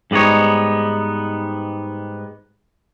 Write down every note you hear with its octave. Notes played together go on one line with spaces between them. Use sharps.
G#2 G3 B3 D#4 C#5